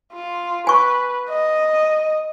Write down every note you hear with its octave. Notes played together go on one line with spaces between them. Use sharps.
F4
B4 G#5 C#6
D#5